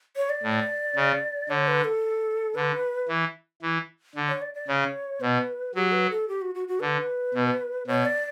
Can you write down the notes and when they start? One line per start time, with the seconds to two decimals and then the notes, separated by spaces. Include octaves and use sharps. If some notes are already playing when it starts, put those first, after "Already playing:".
0.17 C#5
0.30 D5
0.43 A2
0.96 C#3
1.49 D3 C#5
1.68 B4
1.84 A4
2.55 D3 B4
3.09 E3
3.62 E3
4.15 D3
4.28 C#5
4.42 D5
4.55 D5
4.68 C#3 C#5
5.21 B2 B4
5.75 F#3 G4
5.92 B4
6.10 A4
6.28 G4
6.42 F#4
6.55 F#4
6.68 F#4
6.81 D3 B4
7.34 B2
7.87 B2 C#5
8.05 D5